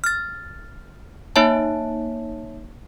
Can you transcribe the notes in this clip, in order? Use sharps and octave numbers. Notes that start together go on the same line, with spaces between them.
F6 A6
A#3 D#4 C#5 E5 A5